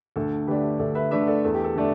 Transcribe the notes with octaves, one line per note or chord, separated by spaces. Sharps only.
D2 A4
D3 A3 D4 G4 B4
D2 A4 D5
B4 E5
D3 A3 D4 B4 E5
A4 D5
E2 A4
G4
A4
D3 A3 D4